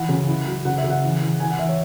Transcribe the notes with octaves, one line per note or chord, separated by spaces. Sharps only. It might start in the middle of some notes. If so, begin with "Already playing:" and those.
Already playing: E3 E4 F#5
C#3
E4
F#3
C#3 F#5
E5
C#3
F#5
E3
E3
E3 G#5
F#5
E3 E5
C#5